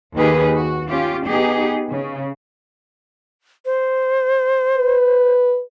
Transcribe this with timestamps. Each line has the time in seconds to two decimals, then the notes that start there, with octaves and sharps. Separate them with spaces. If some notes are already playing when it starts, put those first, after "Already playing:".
0.17 D#2 D#3 D#4 G4 G#4 B4
0.55 F#4
0.89 C#4 F4 G4
1.26 B3 D#4 G4 G#4
1.90 C#3
3.65 C5
4.76 B4